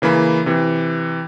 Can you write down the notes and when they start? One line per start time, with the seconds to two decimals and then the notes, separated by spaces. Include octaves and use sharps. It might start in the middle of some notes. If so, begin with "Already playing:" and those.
0.02 C#3 E3 A#3 B5
0.46 C3 E3